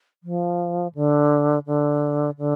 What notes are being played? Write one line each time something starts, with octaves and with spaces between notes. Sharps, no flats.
F3
D3
D3
D3